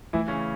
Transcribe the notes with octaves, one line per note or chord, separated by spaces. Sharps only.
E3 A3 E4
C#3 C#4